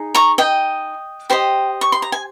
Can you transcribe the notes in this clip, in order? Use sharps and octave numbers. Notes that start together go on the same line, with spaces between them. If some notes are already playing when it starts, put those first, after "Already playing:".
Already playing: D#4 G#4
A#5 C#6
D#5 G5
G4 C5 D#5
C#6
C6
A#5
G#5